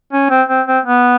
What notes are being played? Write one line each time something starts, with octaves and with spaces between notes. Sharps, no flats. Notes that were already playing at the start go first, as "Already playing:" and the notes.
C#4
C4
C4
C4
B3